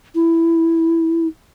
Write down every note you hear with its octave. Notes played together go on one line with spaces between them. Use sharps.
E4